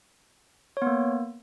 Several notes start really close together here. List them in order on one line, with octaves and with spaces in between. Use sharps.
C#5 B3 A#3